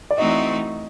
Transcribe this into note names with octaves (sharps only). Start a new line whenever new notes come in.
D5
E3 A3 C4 D#4 F#4 D#5